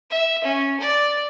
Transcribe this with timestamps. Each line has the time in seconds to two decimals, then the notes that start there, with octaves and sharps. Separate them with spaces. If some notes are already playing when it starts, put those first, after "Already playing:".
0.11 E5
0.44 C#4
0.80 D5